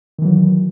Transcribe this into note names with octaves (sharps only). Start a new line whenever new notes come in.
D#3 E3 F#3